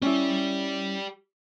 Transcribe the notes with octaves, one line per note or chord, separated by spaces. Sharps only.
C#4 E4 G4 D5